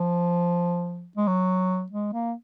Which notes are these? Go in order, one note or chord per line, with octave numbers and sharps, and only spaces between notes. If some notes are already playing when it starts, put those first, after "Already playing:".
Already playing: F3
G#3
F#3
G#3
A#3